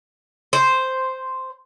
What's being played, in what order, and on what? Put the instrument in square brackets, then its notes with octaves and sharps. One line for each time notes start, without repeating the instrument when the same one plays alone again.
[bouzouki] C5